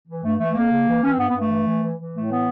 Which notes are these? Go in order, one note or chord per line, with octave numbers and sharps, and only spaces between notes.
E3
G2 A3
E3 A3
F2 A#3
C#3
E3
E3 C#4
C4
G2 B3
B3
G2 A3
E3
E3
E3
E3
A2 A3
E3 B3